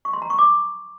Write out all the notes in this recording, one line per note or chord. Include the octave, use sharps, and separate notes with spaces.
C#6
C6
A#5
C#6
D6